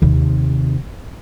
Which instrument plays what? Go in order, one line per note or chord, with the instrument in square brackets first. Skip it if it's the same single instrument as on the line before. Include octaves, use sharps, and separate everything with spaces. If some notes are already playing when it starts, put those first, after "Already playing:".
[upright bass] D#2 C3